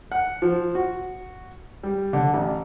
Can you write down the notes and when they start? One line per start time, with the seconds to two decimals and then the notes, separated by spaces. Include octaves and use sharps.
0.12 F#5
0.42 F3
0.75 F#4
1.83 G3
2.13 D3
2.33 A1